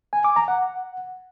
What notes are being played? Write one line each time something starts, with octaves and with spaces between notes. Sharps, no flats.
G#5
D6
A#5
F#5